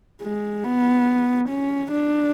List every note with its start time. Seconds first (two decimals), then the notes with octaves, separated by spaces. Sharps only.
0.22 G#3
0.64 B3
1.49 C#4
1.92 D4